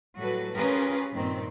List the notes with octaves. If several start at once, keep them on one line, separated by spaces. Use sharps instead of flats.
A2 F#3 G3 F#4 A4 B4
C#4 F4 G4 G#4 A#4 B4
G2 A#2 D#3 C4